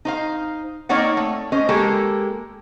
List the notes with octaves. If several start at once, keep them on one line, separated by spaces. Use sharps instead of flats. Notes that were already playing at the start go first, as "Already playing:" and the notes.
D#4 C5 F5
A#3 C4 D#4 C#5 D5 F#5
A3
C#4 C5 D#5
G#3 A#3 G4 A4